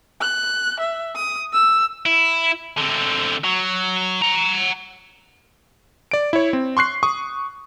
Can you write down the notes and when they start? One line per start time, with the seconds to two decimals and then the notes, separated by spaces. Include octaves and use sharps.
0.21 F#6
0.80 E5
1.15 D#6
1.53 E6
2.06 E4
2.78 D3 C4
3.44 F#3
4.21 F#5 A#5
6.11 D5 D7
6.33 E4 C#5
6.53 C4
6.77 C6 C#6 F#6 C7
7.03 C#6 D#6